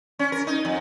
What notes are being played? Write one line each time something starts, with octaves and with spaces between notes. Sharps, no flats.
C#4
A#4
D#4
F2